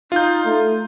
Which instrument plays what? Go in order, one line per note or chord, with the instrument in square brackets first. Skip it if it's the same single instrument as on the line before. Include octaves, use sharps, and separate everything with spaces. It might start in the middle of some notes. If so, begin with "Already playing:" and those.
[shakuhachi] D#4 [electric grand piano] F4 G6
[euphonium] A3